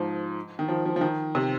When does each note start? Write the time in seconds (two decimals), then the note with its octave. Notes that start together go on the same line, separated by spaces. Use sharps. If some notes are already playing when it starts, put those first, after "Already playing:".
Already playing: G#2 F3
0.59 D#3
0.68 F3
0.86 F3
0.96 F3
1.01 D#3
1.35 C3